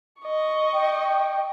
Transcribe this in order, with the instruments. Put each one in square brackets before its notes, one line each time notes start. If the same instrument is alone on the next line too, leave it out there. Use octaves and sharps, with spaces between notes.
[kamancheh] D#5 C#6
[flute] G5